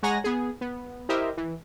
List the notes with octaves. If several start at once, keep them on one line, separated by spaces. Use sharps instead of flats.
G#3 C#5 F#5 G#5 A#5 A#6
B3 G#4
B3
E4 G4 A#4 C5 D#5 E5
E3